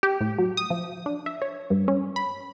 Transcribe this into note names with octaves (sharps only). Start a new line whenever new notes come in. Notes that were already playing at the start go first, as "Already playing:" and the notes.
G4
A2
F#3
D#6
F3
D4
E5
C#5
G2
C#4
B5